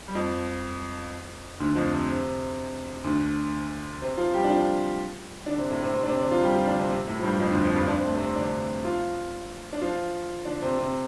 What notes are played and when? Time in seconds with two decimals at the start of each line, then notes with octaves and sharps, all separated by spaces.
0.08 G3
0.15 F2 F3
1.60 D2 D3
1.75 F2 F3
1.92 C3
2.09 C3
3.04 D2 D3
4.02 C3 C4
4.17 F3 F4
4.34 G3 G4
4.44 D4
4.49 F3 F4
5.46 D3 D4
5.58 C3 C4
5.70 A2 A3
5.82 C3 C4
5.94 C3 C4
6.03 D4
6.07 C3 C4
6.18 D3 D4
6.31 F3 F4
6.43 G3 G4
6.55 F3 F4
6.67 D3 D4
6.79 C3 C4
6.91 C3 C4
7.07 A2 A3
7.19 F3
7.23 G2 G3
7.40 F2 F3
7.51 D2 D3
7.64 F2 F3
7.75 G2 G3
7.88 D4
7.97 C4
8.06 A3
8.16 C3 C4
8.36 D3 D4
8.84 F3 F4
9.73 D4
9.81 F3 F4
10.45 D3 D4
10.62 C3 C4
10.78 C3 C4